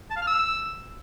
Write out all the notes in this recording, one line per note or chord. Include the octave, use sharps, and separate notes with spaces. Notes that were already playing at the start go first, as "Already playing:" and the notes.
A5
F5
F6
E6